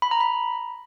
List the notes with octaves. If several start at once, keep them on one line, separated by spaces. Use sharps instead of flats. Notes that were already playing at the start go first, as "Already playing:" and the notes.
B5
A#5
B5